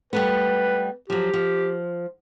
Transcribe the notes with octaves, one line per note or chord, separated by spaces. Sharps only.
G3 A3 B3 B4
F3 F#3 G4
F3